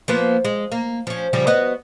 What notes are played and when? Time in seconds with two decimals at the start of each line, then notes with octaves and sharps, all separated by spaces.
0.08 F3 A#3 B3
0.45 G#3
0.72 A#3
1.07 F3 C#4
1.33 C#3 F3 G3
1.47 B3 F#4 D#5